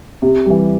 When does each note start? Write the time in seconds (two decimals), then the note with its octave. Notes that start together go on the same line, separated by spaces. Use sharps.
0.22 C3
0.46 E3 G3